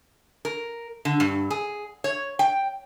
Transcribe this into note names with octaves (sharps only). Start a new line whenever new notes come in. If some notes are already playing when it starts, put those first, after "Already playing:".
A#4
D3
G2
G#4
C#5
G5